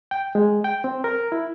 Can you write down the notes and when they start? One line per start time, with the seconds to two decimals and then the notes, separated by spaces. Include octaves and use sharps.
0.11 G5
0.35 G#3
0.64 G5
0.84 C4
1.04 A#4
1.32 E4